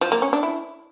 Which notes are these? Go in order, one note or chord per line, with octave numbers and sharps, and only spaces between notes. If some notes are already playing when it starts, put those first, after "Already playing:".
F3
A#3
C#4
D4
E4